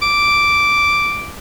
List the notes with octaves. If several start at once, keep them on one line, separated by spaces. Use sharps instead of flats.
D6